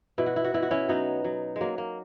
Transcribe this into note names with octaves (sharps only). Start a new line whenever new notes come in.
B2 E4
F#4
E4
F#4
B2 E4
F#4
C#4 E4
F#3 B3 D#4
F#3
G#3
F#3 A#3
A#3